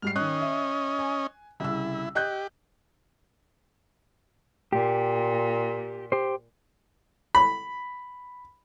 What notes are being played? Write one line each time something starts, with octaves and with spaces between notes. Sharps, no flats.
G#2 G3 F6 C7
D#3 C#4 D#5 F#6
E5
G#5
C2 C#3 E4 E6
G4 D#5 F#6 G6
A#2 G4
G4 C5
B5